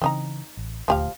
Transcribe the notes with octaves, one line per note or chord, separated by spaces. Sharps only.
C#3 E3 C4 D#4 A#5
A1
D#1 D2 F3 A3 G4 F5